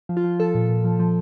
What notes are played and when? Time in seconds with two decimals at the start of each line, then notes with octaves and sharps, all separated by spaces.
0.09 F3
0.17 F4
0.24 F3
0.39 F3 A4
0.55 A#2
0.69 A#2
0.85 F3
1.00 F3